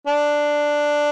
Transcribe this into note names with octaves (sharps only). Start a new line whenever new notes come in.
D4